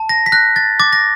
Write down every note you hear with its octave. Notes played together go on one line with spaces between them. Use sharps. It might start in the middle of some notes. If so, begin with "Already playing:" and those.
Already playing: A5
A#6
B6
F#6 A#6
A6
D6 A6
A#6